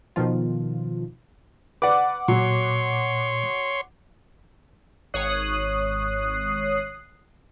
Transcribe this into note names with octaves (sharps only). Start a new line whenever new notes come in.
B2 D#3 F3 F4
B4 D5 F#5 D6
A#2 F#3 C#5 C6
G#1 C#5 D#6 F#6 C7